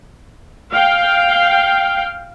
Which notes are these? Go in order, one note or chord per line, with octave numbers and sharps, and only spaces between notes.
F5 G5